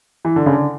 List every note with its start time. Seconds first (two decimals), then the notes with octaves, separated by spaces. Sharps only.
0.25 E3
0.36 D3
0.46 C#3
0.53 D3